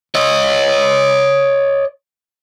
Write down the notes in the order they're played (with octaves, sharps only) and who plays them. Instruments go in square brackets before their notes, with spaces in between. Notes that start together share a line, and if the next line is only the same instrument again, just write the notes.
[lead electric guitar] C#5 D#5